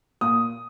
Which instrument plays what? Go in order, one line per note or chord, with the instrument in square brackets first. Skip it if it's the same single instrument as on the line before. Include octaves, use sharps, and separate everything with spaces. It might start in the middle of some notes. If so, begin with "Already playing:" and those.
[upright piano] A#2 D#6